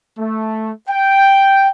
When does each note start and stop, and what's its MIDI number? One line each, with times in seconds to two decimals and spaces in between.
0.18 0.70 57
0.89 1.68 79